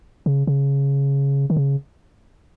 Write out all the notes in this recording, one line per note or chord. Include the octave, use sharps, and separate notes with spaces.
C#3
C#3
D#3
C#3